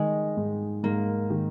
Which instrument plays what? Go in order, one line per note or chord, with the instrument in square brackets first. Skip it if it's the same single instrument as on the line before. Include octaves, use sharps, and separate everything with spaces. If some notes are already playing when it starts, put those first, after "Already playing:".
Already playing: [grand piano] D#3 [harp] G#3
[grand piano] G#2
[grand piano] G#2 [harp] A#3
[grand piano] D#3